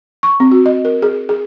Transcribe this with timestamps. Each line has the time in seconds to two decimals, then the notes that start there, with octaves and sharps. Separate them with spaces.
0.23 C#6
0.40 C4
0.52 F#4
0.66 D#5
0.85 A#4
1.02 G#4
1.29 G#4